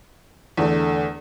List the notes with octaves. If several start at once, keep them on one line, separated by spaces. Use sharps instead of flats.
E2 D3 A3